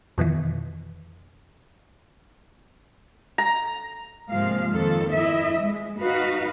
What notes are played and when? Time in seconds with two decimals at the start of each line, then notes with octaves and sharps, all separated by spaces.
0.18 F2 B2 D#3 E3
3.38 A#5
4.30 G#2 C3 F3 G#3 A#3 F5
4.72 F2 D#3 A#3 A4
5.14 F2 E4 D#5 E5
5.61 G#3
6.01 D#4 F#4 B4 F5